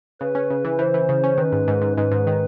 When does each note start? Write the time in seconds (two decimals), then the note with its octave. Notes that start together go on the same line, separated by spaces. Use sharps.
0.21 C#3 B4
0.35 C#4
0.50 C#3
0.65 E3
0.79 E3 C5
0.94 E3
1.09 C#3
1.23 C#4
1.38 D#3 B4
1.52 G#2
1.68 G#2
1.82 G#2
1.97 G#2 B4
2.11 G#2
2.27 D#3